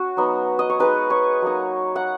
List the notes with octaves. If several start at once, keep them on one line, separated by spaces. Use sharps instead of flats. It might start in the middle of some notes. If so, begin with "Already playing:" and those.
Already playing: C#4 F#4
F#3 B3 D#4
D#5
C#5
G#3 D#4 B4
C#5
F#3 A#3 D#4
F#5